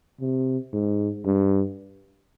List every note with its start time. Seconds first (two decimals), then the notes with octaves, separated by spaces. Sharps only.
0.20 C3
0.73 G#2
1.25 G2